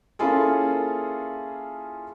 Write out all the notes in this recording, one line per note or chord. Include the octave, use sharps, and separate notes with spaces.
A#3 C#4 E4 F4 G#4 A4